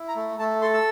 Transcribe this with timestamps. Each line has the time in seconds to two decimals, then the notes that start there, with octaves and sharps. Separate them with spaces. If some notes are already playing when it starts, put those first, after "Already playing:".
Already playing: E4
0.08 A#5
0.16 A3
0.39 A3 A5
0.62 A4 C6
0.73 E6